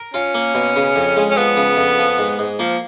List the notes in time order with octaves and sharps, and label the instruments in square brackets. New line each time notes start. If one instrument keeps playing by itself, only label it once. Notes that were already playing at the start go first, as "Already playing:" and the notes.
Already playing: [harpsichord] A#4
[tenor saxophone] C#4 [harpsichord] F4
[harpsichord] A#3
B2
C#3
F2
G#3
[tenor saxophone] C#4
[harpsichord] F3 [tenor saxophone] B3
[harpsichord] C#3
F2
F3
G#2
G#2
[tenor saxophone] F3 [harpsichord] A#3